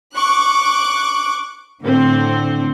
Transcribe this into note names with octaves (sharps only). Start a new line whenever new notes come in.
C#6 D6 F#6
A2 D3 C4